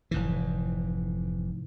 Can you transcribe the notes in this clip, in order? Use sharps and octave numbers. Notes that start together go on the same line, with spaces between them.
F1 G#2 E3